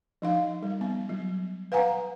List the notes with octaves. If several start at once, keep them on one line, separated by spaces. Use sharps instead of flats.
F3 D#4 F5
G3
B3
F#3
B4 F5 F#5 G#5 A#5